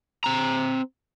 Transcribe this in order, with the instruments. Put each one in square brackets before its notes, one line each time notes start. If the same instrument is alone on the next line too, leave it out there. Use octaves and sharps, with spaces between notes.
[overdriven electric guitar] C4 A#5